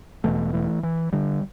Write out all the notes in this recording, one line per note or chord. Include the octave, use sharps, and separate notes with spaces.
E1 E2 B2 E3 A3
E3 A3
E3
D3 G3